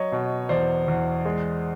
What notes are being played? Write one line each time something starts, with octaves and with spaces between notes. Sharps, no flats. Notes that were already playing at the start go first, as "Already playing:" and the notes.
Already playing: F#3 C#5 D#5
B2
E2 C5 D5
E2
G#3